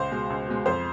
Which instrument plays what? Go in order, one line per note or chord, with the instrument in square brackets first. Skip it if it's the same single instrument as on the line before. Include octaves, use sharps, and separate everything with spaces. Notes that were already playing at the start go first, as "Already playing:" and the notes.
Already playing: [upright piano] C#2 C5
B2 G#3
C#2
B2 G#3
F2 C5